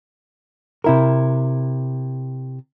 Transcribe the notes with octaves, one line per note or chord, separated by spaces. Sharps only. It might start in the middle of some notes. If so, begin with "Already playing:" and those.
C3 E4 A#4